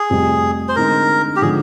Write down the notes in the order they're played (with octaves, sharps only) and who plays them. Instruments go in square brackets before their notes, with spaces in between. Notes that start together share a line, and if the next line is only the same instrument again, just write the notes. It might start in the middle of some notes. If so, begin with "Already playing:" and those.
Already playing: [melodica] G#4
[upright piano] F1 F2 C3 G3 C4
[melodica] C5
[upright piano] D3 G#3 C4 D#4 [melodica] A#4
[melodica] G4
[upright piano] D3 F3 G#3 D#4 [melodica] G#4